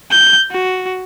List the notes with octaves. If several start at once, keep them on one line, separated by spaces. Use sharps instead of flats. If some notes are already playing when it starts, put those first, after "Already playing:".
G6
F#4